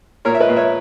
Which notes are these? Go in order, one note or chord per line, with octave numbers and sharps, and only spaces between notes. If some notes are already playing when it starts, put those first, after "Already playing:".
A#2 A#4 C#5
E5
B4 D#5
A#2
C#5 E5